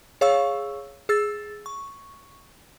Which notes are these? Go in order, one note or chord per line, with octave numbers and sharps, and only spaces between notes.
G#4 C#5 F5 C#6 E6
G#4 E6 A6
C#6